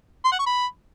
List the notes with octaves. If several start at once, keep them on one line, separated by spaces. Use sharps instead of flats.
C6
F#5
C#6
B5